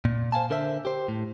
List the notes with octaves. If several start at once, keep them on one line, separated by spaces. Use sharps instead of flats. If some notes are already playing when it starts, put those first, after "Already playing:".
A#2
C5 F5 G#5 A5
D3 A#4 C5 E5
G4 C5
A2